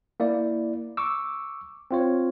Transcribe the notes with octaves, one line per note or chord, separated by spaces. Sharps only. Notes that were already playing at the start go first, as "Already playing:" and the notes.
A#3 E4 D5
C#6 D6 E6
C4 F4 C#5